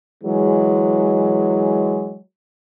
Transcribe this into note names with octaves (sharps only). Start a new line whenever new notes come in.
E3 F#3 G#3